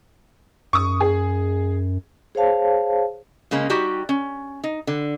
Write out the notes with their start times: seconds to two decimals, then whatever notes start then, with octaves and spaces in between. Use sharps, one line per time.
0.73 F#2 C#6 D#6
1.00 G#4
2.35 G#4 C5 C#5 F5 A5
3.51 C#3 G#3 A#3 C#4
3.70 G3 D#4 F#4 G4
4.09 C#4
4.64 D#4
4.87 D3